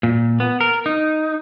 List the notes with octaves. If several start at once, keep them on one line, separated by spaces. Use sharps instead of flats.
A#2
B3
A#4
D#4